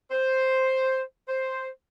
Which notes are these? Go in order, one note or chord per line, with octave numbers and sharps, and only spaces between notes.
C5
C5